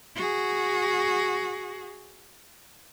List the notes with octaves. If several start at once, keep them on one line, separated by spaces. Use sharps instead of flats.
F#4 G#4